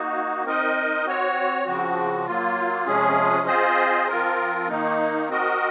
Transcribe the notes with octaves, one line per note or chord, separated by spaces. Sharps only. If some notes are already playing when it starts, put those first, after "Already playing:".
Already playing: A#3 D#4 F#4
C4 D#4 A#4 D#5
C4 F#4 C#5
C#3 F3 C4 F#4
F#3 A#3 F4
C3 F3 G#3 C#4 G#4
C4 F4 G#4 C5 D#5
F3 C4 F4 A#4
D#3 A#3 D#4
C4 F#4 A#4 D#5